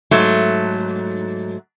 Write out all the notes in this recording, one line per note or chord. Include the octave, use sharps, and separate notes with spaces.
G#2 F#3 A3